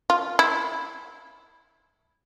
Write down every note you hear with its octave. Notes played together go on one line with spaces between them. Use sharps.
F4
E4